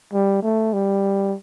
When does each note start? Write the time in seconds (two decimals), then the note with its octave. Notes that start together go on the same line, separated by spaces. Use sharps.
0.13 G3
0.43 A3
0.73 G3